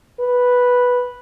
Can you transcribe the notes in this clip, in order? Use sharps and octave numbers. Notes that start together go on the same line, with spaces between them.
B4